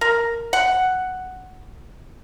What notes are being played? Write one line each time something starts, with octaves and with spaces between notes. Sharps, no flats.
A#4
F#5